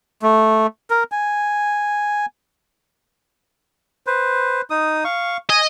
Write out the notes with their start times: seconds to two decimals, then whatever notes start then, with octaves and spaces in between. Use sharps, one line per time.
0.22 A3
0.90 A#4
1.12 G#5
4.07 B4 C5
4.70 D#4 D#6
5.04 F5 C#6
5.50 D#5 G#5